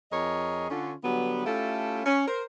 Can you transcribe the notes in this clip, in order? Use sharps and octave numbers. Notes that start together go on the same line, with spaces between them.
F2 G#4 A#4 C#5 D#5
D3 C#4 F4
D3 F#3 G3 B3
A3 C#4 E4 F4 G4 A4
C#4
A#4 C5